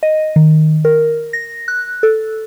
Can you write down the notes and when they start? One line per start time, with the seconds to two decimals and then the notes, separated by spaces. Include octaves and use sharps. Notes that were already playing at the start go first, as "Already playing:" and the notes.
0.03 D#5
0.36 D#3
0.85 A#4
1.33 A#6
1.68 F#6
2.03 A4